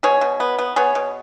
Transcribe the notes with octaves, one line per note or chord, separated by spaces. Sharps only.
B2 G#4 C#5
B2
B3
B3
B3 G#4 C#5
B2